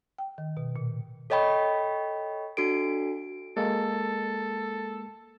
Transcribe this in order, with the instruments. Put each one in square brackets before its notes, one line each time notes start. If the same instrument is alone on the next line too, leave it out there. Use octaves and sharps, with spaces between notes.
[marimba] G5
D#3
B2
A#2
[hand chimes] A4 C#5 D#5 G5 B5 C#6
D4 F#4 A4 D7
[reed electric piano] G#3 A#3 [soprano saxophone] A4